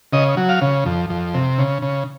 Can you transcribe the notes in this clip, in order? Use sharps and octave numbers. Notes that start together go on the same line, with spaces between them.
C#3 D#5
F#3
F5
C#3
F2
F2
C3
C#3
C#3